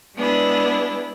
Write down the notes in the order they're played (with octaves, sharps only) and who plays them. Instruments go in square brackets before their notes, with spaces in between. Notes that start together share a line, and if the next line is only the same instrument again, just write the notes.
[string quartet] G#3 B3 D4 E4